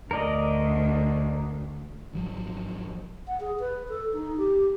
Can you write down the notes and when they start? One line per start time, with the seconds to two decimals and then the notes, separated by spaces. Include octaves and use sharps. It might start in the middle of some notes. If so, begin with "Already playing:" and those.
0.11 D2 A#4 D5 D#5
2.13 G#1 F3 F#3
3.27 F#5
3.40 G#4
3.60 B4
3.89 A4
4.13 D#4
4.38 G4